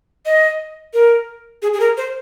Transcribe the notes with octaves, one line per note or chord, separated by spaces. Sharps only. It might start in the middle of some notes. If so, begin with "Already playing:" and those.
D#5
A#4
G#4
G#4
A#4
C5